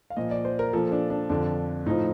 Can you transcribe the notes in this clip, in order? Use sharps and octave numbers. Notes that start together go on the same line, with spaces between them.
F5
A#2 F3 D#5
D5
C5
A#4
A#2 F3 A4
D4
D4
F2 D3 F3 D4
A2 F3 D#4